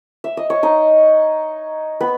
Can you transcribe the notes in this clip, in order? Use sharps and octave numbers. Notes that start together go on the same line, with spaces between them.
E5
D#5
C#5
D#4 D#5
B3 B4